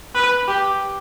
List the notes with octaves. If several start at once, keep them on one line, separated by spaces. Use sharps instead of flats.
B4
G4